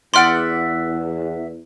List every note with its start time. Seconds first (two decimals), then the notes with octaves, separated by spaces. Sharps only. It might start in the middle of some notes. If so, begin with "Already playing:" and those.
0.14 E2 D5 E5 F#5 C6 F6 D7